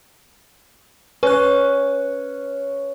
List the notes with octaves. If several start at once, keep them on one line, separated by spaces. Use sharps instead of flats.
C#4 B4 F#6